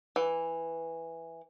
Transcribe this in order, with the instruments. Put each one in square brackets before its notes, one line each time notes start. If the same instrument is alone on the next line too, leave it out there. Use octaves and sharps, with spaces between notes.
[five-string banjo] E3